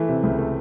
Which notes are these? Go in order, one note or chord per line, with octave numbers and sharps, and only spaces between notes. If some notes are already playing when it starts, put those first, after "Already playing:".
Already playing: E3 A3
C3
C#2
A3